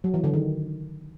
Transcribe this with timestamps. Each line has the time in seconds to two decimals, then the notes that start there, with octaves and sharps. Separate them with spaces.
0.04 F#3
0.14 E3
0.24 D3
0.34 D#3